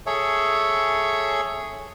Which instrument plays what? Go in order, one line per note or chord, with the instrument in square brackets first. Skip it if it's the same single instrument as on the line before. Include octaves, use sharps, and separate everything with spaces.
[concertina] G#4 A4 C#5 E5